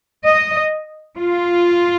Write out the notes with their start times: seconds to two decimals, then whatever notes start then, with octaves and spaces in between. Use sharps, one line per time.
0.25 D#5
1.17 F4